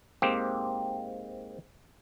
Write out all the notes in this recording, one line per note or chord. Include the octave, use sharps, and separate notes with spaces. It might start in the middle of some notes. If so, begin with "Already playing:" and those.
G#2 A#3 C4 G4